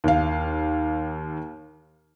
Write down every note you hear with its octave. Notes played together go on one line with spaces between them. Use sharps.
D#2 F5